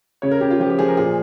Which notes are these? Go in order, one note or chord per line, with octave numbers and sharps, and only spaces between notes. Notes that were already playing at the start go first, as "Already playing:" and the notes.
C#3 C#5
A#4
C#3 G4
F4
F3 G4
G4
F3 G#4
A#4
A#2 G#4